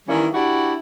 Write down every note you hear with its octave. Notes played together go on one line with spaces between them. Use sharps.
D#3 E3 G3 A#3 C#4 E4
D4 E4 F#4 G4